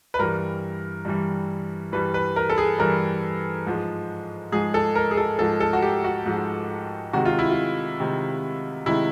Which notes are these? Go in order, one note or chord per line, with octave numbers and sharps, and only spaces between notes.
B4
G2 E3 G3 A#4
G2 E3 G3
G2 E3 G3 B4
B4
A#4
A4
G#4
G2 E3 G3 A#4
G#2 F3 G#3
G#2 F3 G#3 G#4
A4
A#4
G#4
A4
G#2 F3 G#3 A4
A4
F#4
G4
F#4
G#2 F3 G#3
C3 D#3 G#3 F#4
F4
E4
F4
C3 D#3 G#3
C3 D#3 G#3 E4